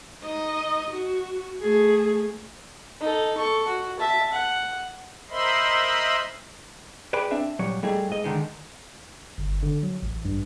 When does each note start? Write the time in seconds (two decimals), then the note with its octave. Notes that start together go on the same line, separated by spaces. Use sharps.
0.24 D#4 D#5
0.90 F#4
1.61 A3 G#4
3.01 D#4 A4
3.37 A4 C#6
3.67 F#4
3.99 E5 A5
4.32 F#5
5.30 A#4 C5 D#5 E5 B5 C6
7.13 G#4 B4 D5 G5 B5
7.31 C4 D4 E5
7.59 A#2 F#3 G3 C#5
7.83 G3 A3 D#4 G#4
8.09 G#2 D#5
8.24 D3 D#3 G#3
9.38 G1
9.63 D3
9.83 F#3
10.02 A1
10.25 G2